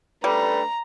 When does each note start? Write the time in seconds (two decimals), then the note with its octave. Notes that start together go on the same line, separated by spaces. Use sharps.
0.24 G3 A3 D4 B4 A#5